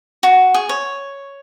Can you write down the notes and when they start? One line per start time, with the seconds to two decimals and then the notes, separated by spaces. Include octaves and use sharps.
0.23 F#4
0.54 G#4
0.69 C#5